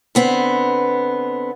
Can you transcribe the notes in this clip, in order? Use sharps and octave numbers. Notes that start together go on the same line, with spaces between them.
D3 B3 C4